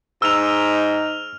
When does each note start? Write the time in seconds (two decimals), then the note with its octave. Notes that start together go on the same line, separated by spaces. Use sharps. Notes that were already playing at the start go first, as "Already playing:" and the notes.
0.22 G#2 D#4 E6 F6 F7